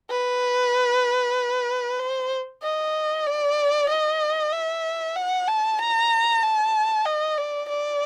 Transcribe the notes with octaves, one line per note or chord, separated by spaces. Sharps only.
B4
C5
D#5
D5
D#5
E5
F#5
A5
A#5
A5
D#5
D5
D5